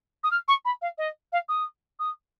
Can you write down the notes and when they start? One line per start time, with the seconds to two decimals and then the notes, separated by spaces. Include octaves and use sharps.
0.23 D#6
0.31 F6
0.48 C#6
0.65 B5
0.81 F5
0.98 D#5
1.32 F5
1.49 D#6
1.99 D#6